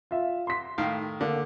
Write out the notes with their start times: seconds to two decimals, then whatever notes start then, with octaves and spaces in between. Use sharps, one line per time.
0.11 F4 E5
0.47 C6 B6
0.78 A2 D#3 F5
1.21 D3 A#3